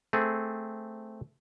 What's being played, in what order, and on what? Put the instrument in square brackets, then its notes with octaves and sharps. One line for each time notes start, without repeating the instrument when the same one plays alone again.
[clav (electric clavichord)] A3 C4 G#4